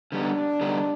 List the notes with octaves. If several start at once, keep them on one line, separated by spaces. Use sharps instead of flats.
D3 G3 B3 D4 D#4
D3 G3 B3 D#4